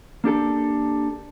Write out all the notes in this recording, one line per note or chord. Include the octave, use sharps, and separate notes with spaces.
A#3 D4 G4 A4